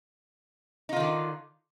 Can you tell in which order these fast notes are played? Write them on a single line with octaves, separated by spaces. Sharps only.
D#4 F4 D#3 D3